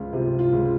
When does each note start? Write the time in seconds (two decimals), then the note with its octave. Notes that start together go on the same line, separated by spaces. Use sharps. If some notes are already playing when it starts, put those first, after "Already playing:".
Already playing: C#2 F3 F4
0.13 C3 F4
0.39 F4
0.52 C#2